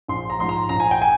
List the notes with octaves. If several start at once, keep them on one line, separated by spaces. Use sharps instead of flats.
A#1 C6
A#5
G#2 F3 C6
A#5
A#1 A#5
G#5
G5
G#5